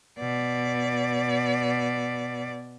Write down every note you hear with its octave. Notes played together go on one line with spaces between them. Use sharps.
B2 D5